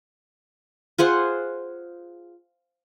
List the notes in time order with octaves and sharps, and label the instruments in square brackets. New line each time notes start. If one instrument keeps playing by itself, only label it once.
[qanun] F4 G#4 C5 F#5